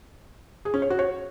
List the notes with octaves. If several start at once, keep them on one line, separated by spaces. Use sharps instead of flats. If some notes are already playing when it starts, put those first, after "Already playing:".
G#4
C#4
C#5
F#4
C#5